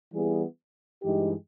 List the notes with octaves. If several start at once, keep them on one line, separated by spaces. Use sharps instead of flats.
E3 G3 B3 E4 G#4
G2 E3 G#3 D#4 G4